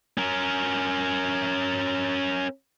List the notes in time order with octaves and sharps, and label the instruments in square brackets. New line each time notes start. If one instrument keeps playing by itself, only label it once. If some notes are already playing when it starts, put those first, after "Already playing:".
[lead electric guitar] C#4 A#4